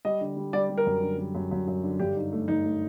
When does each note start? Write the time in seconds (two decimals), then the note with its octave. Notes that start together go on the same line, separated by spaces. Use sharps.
0.05 G3 D#5
0.21 D3
0.37 G3
0.53 G3 D5
0.70 G3
0.78 A#4
0.86 F#2
1.02 D3
1.18 G3
1.35 F#2
1.51 F#2
1.68 F#2
1.84 D3
2.00 G2 G4
2.16 D#4
2.32 A3
2.48 G2 D#4
2.65 A3